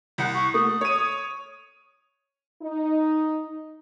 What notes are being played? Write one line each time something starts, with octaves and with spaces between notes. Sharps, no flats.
C2 F#5
C#6
A3 D#6
C#5 D#7
D#4